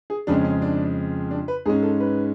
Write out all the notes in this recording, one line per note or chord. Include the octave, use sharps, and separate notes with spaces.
G#4
F2 C#3 G#3 C#4 D4
C#4
D4
D4
B4
G#2 G#3 C#4 G#4
A4
B4